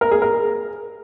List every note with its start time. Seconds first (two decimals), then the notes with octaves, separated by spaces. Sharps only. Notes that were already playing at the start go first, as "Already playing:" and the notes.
0.01 A#4
0.11 G#4
0.22 A#4